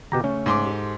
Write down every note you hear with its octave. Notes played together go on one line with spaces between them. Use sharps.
B2 D3 G4 A#5
C#3 A3 C#4
G#2 C6 D6
G4 A4